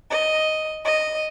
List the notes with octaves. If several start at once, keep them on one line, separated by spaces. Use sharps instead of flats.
D#5
D#5